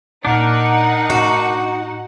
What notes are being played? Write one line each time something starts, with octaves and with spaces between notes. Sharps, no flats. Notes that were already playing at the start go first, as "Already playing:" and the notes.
A#2 D4 D#4 A#4 F#5 G6
A2 F#4